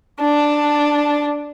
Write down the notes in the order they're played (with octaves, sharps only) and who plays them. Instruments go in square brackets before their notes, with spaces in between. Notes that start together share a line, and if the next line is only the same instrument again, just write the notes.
[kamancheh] D4 A5